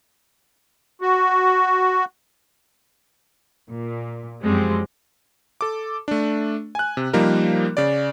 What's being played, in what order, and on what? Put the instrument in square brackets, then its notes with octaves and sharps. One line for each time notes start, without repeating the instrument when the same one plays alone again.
[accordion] F#4
[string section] A#2
F#2 F3 G3 G#3 C4
[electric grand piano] A4 D6
A3 D4
G#5 F#6
C3
F3 G3 A#3 D#4 A#4
C#3 D5